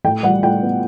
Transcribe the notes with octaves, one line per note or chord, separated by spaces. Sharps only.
A2 G5
G3 F#5
A2 G5
B3